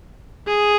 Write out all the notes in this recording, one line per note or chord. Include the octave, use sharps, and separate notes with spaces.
G#4